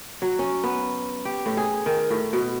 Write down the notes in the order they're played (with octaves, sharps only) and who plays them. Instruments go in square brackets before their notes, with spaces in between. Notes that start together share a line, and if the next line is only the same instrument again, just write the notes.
[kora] F#3
C#4
B3
G4
A2
G#4
D#3
A2
B2